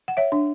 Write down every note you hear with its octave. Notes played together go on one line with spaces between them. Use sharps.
F#5
C#5 E5
D4